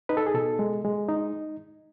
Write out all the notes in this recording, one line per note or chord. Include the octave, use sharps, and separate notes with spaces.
D#4 B4
A4
G#4
B2 A4
G#3
G#3
D#4